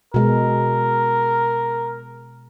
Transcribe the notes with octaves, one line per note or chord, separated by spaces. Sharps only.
B2 G#3 A#4